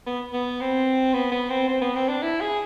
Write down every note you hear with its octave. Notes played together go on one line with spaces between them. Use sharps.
B3
B3
C4
B3
B3
C4
C4
B3
C4
D4
E4
G#4